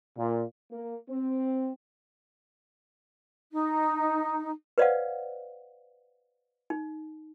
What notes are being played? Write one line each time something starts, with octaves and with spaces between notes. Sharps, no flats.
A#2
A#3
C4
D#4
B4 C5 D5 D#5 F5 F#5
D#4